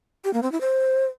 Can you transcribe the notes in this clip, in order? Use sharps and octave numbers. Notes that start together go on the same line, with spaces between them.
G4
A#3
C4
E4
C5